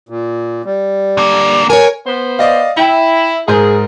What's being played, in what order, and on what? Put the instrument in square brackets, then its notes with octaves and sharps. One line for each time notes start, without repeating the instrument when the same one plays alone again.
[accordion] A#2
G3
[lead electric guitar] D3 A#3
[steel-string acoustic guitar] A#4 C5 C#5 [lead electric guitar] G#5
[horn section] B3 C5
[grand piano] D5 D#5 F5
[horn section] E4 [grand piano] E5 G5
[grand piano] G#2 A#4 G6 [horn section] G#4